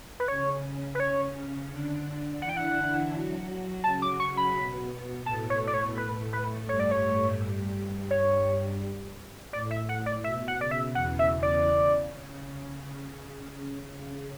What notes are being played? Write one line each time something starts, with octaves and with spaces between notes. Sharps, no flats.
B4
C#3 C#4 C#5
B4
C#3 C#4 C#5
D3 D4
E3 E4 F#5
G5
F#5
F#3 F#4
C#3 C#4 A5
D6
C#6
B5
B2 B3
A2 A3 A5
C#5
D5
C#5
B4
B4
G2 G3 C#5
D5
C#5
C#5
A2 D5
E5
F#5
D5
B2 E5
F#5
C#3 D5
E5
E2 E3 F#5
E5
D5
C#3